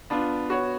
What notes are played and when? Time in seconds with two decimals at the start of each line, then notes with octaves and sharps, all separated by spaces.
0.10 B3 D4 F4
0.49 B3 F#4 C#5